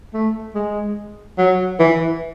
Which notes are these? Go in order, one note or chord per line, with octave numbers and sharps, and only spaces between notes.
A3
G#3
F#3
E3